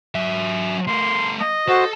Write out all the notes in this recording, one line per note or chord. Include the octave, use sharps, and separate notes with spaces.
F#3 E5
A3 A#4 C6
D#5
F#4 A4 C5